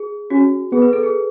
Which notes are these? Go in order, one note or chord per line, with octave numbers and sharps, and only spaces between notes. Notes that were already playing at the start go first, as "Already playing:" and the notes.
Already playing: G#4
C#4 F#4
B3 G#4
B4
A4
G#4